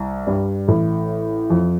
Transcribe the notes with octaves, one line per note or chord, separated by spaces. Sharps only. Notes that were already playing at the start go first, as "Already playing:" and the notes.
Already playing: C2
G2 G3
A1 A2
F2